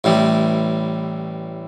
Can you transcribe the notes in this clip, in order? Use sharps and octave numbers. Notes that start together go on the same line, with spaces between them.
A1 A2 E3 G3